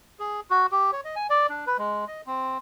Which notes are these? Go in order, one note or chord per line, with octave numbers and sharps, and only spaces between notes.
G#4
F#4
G4
C#5
D#5
G#5
D5
D4
B4
G#3
D#5
C4